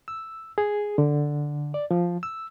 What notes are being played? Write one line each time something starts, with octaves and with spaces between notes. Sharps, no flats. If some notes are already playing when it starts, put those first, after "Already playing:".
E6
G#4
D3
D5
F3
E6